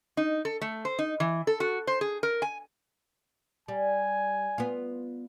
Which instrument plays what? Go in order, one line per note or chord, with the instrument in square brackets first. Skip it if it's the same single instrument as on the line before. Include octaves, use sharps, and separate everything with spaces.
[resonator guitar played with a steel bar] D#4
A4
A3
C5
D#4
E3
A4
F#4
C5
G#4
A#4
G#5
[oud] G3 [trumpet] G#5
[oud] B3 F4